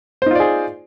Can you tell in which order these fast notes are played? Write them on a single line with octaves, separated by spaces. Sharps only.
C5 D#4 F4 D5 G#4